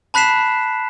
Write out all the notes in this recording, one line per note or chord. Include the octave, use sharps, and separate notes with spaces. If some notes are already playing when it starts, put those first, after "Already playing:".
A5 B5 F#6 B6 C7 E7